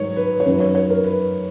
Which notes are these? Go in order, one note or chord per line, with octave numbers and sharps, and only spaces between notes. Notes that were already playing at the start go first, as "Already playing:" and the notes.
Already playing: G#2 D#3 F#3 C#5
B4
C#5
F#2 D#3 F#3 B4
C#5
C#5
A#4
B4